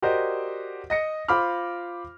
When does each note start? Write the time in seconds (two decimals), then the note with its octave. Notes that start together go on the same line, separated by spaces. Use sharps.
0.02 F#4 G4 A#4 C5 D5 D#5
0.90 D#5 A#6 C#7
1.28 F4 C5 B5 D6 F6